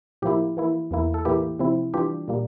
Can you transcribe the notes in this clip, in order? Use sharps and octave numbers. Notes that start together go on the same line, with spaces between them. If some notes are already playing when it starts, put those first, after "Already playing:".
A2 F3 A#3 E4 G4
E3 A#3 E4
E2 E3 A#3 E4
A4
A2 E3 A#3 E4 G4
C3 F3 C4 E4
E3 G3 D4 F4 G4
A#2 G3 A#3